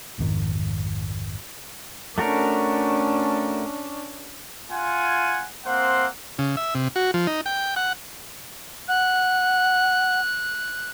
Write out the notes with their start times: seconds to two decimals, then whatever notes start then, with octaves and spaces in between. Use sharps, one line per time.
0.18 A#1 F2 G#2 D#3
2.18 A3 C#4 D4 F#4 A#4
4.70 F4 F#5 G#5
5.65 A#3 C4 C5 F#5
6.39 C#3
6.57 E5
6.75 C3
6.96 F#4
7.14 F3
7.27 D#4
7.46 G5
7.76 F#5
8.88 F#5 F#6